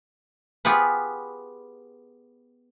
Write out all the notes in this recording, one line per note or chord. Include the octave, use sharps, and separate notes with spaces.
B3 F4 G4 G#4 B4